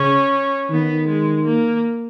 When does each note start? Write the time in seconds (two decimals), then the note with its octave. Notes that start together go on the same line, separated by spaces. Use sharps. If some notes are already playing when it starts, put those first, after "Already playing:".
Already playing: C#3 C#4
0.70 D#3 B3
1.08 G#3
1.45 A#3